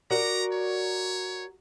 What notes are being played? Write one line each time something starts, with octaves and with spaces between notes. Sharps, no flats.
F#4 A#4 D5 A#5
C#5